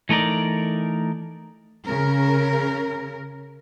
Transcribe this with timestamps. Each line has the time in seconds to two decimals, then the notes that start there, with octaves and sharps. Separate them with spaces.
0.09 E3 A3 D#4 A#4 D5
1.86 C#3 A#4